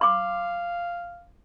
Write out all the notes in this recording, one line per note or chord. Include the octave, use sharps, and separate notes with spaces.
F5 C6 D6